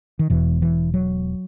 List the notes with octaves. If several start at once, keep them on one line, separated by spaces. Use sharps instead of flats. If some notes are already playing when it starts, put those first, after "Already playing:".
D#3
E1 E2 B2 E3
E3
F#3